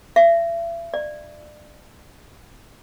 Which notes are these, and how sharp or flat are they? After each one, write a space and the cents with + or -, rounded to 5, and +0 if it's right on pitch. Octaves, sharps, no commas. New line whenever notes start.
E5 +40
D5 +30